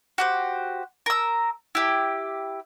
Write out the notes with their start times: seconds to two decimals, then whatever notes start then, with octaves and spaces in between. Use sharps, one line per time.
0.18 F#4 G4 C5
1.06 A#4 E6
1.75 E4 G4